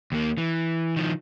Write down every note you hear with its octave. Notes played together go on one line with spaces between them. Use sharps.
D#2 A#3
E3
D#3 F3